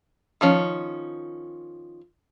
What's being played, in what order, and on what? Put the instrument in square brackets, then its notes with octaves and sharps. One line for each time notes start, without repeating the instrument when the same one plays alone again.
[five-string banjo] D#3 F3 C#4